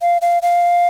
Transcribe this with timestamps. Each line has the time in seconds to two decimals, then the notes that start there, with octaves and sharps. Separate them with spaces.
0.02 F5
0.22 F5
0.42 F5